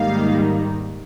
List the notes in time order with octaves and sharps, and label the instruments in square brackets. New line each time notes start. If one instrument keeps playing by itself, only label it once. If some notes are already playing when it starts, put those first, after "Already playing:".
Already playing: [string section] G#2 D#3 G3 A#3 D#4 F5